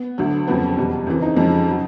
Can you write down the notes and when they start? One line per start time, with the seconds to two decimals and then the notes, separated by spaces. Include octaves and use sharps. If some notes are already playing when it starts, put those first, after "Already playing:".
Already playing: B3
0.18 D2 D3 F#3
0.48 F2 C#3 F#3 B3
0.77 E2 B2 G3
1.07 F#2 C#3 E3 C4
1.22 D#4
1.37 F2 C#3 F3 G#3
1.68 C#3 F#3